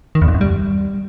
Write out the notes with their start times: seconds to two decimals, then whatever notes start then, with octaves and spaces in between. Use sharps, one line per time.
0.15 D#3
0.22 E2
0.28 F2
0.34 F#2
0.41 G3